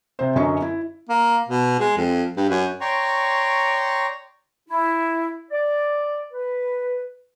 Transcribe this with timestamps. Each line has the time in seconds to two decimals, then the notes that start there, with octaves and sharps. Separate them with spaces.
0.19 C3 C5
0.36 F#2 D3 F#3 C#4 D#5 C#6
0.62 E4
1.09 A#3
1.48 B2
1.79 G#3
1.97 F2
2.37 G2
2.50 F#2
2.81 C#5 D5 G5 A#5 C6 C#6
4.69 E4
5.51 D5
6.32 B4